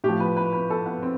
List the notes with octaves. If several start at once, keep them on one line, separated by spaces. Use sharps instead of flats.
A2 F3 G4
B4
B4
B4
A4
B3
C4